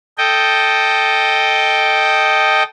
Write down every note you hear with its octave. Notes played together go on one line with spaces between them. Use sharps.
A4 D#5 G5